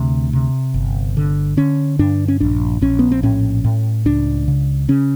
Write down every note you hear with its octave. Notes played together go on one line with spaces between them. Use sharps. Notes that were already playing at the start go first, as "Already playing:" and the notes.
Already playing: D2 C3
C3
G1
D3
D3 C#4
G2 D4
C#4
A#1 D4
A#1 C#4
B3
C4
A2 C#4
A2
C#2 D4
C#3
C#3 C#4